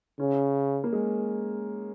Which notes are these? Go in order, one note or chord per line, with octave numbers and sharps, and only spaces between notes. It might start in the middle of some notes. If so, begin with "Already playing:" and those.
C#3 C#4
A#3
G#3